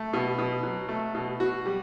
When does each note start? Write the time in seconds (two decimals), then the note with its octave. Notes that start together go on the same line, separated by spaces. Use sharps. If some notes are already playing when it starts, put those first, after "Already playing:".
Already playing: A3
0.13 B2
0.38 B2
0.63 F#3
0.89 A3
1.15 B2
1.40 F#4
1.66 G3